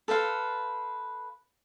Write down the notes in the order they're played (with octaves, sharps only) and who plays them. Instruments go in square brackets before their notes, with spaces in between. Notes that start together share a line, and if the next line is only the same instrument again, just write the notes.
[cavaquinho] A4 B4 C5 F5